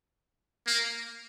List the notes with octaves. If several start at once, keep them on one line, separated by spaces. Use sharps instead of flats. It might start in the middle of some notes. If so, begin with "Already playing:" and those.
A#3